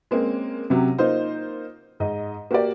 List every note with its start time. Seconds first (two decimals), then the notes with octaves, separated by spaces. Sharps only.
0.11 G#3 A#3 C4 C#4
0.70 C3 F#3 C#4 G4
0.98 A#3 D#4 F4 C5
2.00 G#2 D#5
2.51 A#3 F#4 G4 A#4 D5